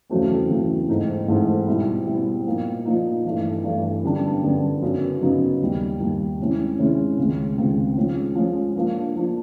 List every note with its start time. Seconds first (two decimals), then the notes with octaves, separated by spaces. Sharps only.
0.09 E2 C#3 F#3 A3 C4
0.50 E2 C#3 F#3 A3 C4
0.88 G#2 E3 A3 C4 D#4
1.28 G#2 E3 A3 C4 D#4
1.67 B2 G3 C4 E4
2.07 B2 G3 C4 E4
2.46 A#2 F3 A#3 D#4
2.85 A#2 F3 A#3 D#4
3.25 G2 E3 A3
3.64 G2 E3 A3
4.03 F#2 D3 G3 B3 D4
4.42 F#2 D3 G3 B3 D4
4.82 F#2 C#3 F#3 B3 D#4
5.21 F#2 C#3 F#3 B3 D#4
5.61 D#2 D#3 G3
6.00 D#2 D#3 G3
6.39 C3 D#3 G#3 C#4 E4
6.78 C3 D#3 G#3 C#4 E4
7.18 C#2 C3 D#3 G#3
7.57 C#2 C3 D#3 G#3
7.97 F3 G#3 C#4
8.35 F3 G#3 C#4
8.75 F3 A#3 D4
9.15 F3 A#3 D4